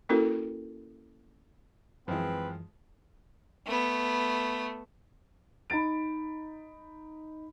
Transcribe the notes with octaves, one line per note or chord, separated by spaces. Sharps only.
A#3 C#4 E4 F#4 A4 A#4
F#2 E3 F3 G#3 C4 B4
A3 B3
D#4 B5 A6 D7